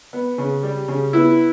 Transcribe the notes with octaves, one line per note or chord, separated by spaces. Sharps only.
B3
C#3
G3
C#3
B3 E4